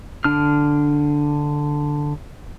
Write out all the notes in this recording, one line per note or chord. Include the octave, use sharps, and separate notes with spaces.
D3 D4 F6